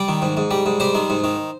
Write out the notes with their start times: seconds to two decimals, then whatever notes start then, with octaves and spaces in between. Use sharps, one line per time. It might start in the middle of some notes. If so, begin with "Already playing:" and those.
Already playing: G3 D5
0.08 D#3
0.22 G#2
0.37 G#2
0.51 G3
0.66 G#2
0.80 G3 C5
0.95 D#3
1.10 G#2
1.24 D#3